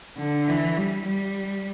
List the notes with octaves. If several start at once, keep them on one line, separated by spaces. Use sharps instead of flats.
D3
E3
G3
G3